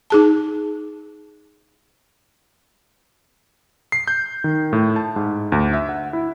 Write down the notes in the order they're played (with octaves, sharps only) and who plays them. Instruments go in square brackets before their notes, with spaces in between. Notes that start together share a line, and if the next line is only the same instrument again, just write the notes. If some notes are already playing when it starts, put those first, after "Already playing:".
[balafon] D#4 G#4 A5
[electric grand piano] C7
G6
D#3
A2
A5
G#2
D2
E5
F#5
E4